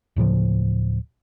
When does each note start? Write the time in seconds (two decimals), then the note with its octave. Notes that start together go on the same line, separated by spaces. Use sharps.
0.16 D1 A2 C#3 F3